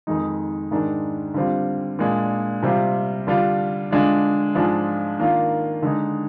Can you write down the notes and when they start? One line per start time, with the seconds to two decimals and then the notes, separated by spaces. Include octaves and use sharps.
0.07 F2 D#3 G#3 D#4
0.71 G#2 D#3 G#3 D4
1.34 D3 G3 C4 F4
1.99 A#2 G#3 D4
2.63 C3 G3 C4 F4
3.27 D3 G3 D4 F4
3.91 D3 G#3 D4 F4
4.55 G#2 F3 G#3 D4 F4
5.19 D#3 A#3 D4 F4
5.82 D3 G#3 D#4